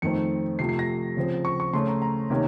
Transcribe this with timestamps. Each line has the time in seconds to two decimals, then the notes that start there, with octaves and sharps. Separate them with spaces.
0.02 F2 D#3 A3 C4 C#7
0.59 C3 F3 A3 C7
0.69 C7
0.79 A#6
1.17 C#3 F3 C4
1.45 C#6
1.60 C#6
1.73 C#3 A3 C#4 C6
1.88 A#5
2.02 A#5
2.30 C3 D#3 A#3 C#4